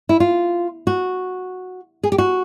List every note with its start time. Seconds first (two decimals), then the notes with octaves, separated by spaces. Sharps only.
0.09 E4
0.20 F4
0.87 F#4
2.03 G#4
2.12 G4
2.18 F#4